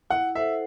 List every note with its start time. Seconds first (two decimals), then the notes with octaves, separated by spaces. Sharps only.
0.10 E4 F#5
0.35 A4 C5 E5 F#5